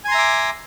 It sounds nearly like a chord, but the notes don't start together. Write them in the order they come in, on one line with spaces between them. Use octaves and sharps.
G#5 C6 A#5 E5 D6